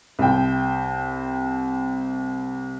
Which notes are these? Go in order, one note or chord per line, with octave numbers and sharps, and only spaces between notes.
C2 G5